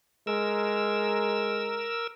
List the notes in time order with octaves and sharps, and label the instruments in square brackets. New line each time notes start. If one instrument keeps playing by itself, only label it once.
[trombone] G#3 [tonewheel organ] A#4 E6